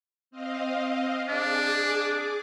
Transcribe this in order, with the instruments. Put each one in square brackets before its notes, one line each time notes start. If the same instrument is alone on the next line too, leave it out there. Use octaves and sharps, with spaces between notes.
[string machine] C4 D#5 F5
[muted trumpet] D4 [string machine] G#4 D6